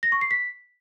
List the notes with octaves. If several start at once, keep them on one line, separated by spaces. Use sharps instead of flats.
A#6
C#6
C7
B6